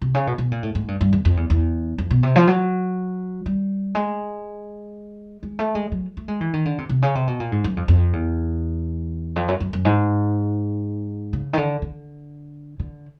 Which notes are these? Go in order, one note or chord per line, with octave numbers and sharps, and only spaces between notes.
C3
C#3
B2
B2
A#2
A2
G#2
G2
G2
E2
F2
E2
E2
F2
B2
C3
F3
F#3
G3
G#3
G#3
A3
G#3
F#3
A3
G#3
E3
D#3
D3
C3
C3
C#3
C3
B2
A#2
G#2
F#2
F2
F2
E2
F2
F#2
F#2
F#2
G#2
C#3
D#3
D3
D3
D3